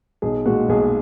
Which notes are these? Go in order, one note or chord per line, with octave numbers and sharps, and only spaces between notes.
B1 G#4
A#2 G#3 F#4
B1 G#4